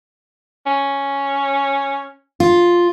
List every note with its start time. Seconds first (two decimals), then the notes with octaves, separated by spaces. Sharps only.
0.66 C#4
2.40 F4